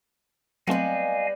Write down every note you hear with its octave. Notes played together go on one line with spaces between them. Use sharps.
F#3 G3 A3 B3 C4 D#5 F5 G#5